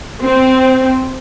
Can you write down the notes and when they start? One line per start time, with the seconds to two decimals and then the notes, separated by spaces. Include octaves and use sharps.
0.23 C4